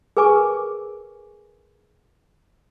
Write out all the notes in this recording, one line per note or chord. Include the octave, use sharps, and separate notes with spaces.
G#4 A#4 B4 G#5 C#6 D6